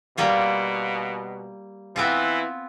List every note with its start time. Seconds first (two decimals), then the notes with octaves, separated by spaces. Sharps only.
0.17 B2 G3 A#3 F4
1.96 E3 B3 C4 F4